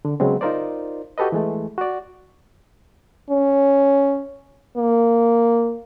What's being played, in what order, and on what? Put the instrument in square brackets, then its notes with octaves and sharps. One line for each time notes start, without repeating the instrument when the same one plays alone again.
[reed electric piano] D3
C#3 F#3 G#3 B3 C4
D#4 F4 A#4 C5 D5
F#4 G4 A4 B4 D#5
E3 G#3 A3
F#4 D5
[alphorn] C#4
A#3